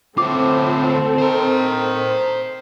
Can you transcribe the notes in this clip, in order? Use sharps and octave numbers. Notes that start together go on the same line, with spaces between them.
D2 A2 C4 F4 A4 D6
D#3 C5 A#5